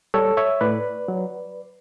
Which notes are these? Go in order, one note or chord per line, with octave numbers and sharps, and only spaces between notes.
G3 A4 C#5
C#5 E5
A2 B4 D5
F#3